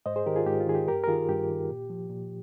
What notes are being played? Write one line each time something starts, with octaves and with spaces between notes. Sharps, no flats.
G#2 C5 D#5
G#4 C5
D#3 G4 A#4
F4 G#4
G#2 G4
F4
D#3 G#4
G4
G2 G4 A#4
A#4
D#3 F4 G#4
G2 G4
D#3
A#2
F3
A#2